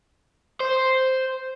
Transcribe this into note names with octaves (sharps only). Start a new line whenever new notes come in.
C5